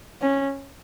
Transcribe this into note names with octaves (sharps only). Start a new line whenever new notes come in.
C#4